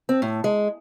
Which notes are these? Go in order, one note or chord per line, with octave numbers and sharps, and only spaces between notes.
C4
A2
G#3